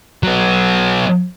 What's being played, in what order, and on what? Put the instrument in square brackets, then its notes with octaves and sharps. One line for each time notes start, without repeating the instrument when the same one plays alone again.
[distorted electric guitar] F#3 B3